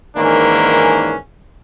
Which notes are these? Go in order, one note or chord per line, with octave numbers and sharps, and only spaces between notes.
G#2 D#3 E3 A#3 C#4 D4